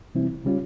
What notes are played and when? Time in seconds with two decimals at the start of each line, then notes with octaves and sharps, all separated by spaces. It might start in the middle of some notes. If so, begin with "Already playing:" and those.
0.15 C3 E3 G3 C4 E4
0.45 C#3 G3 C#4 F4